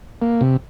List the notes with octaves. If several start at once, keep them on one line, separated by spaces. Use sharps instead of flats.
A#3
C3